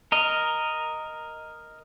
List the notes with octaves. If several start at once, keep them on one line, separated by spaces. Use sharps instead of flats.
A#4 D#5